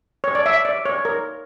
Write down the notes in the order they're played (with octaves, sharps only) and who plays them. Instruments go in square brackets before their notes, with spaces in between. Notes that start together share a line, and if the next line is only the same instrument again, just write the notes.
[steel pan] C#5
D5
E5
D5
C#5
A#4